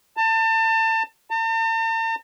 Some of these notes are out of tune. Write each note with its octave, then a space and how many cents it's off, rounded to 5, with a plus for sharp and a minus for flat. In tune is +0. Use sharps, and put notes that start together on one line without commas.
A5 +30
A5 +45